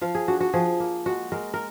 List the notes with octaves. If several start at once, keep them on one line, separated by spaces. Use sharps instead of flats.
F3 F5
G#4
D4 F#4
F#4
F3 G#4
A#3
G#3 F#4
G#3 A#4
A#4